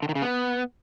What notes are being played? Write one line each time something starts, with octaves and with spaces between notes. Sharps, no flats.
D3
D#3
C#3
B3